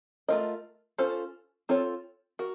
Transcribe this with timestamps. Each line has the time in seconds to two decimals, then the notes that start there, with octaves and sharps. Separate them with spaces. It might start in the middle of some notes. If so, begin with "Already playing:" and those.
0.29 A3 C#4 F4 A#4 D#5
0.98 C#4 F4 A4 C5
1.69 C4 F4 A4 C#5
2.39 F#4 A#4